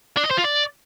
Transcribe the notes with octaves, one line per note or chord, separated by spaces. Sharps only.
D4
D#5
C5
F4
D5